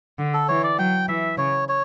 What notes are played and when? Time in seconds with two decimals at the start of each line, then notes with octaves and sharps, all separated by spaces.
0.19 D3
0.34 A4
0.49 E3 C#5
0.64 D5
0.78 F#3 G5
1.09 E3 E5
1.38 C#3 C#5
1.69 C#5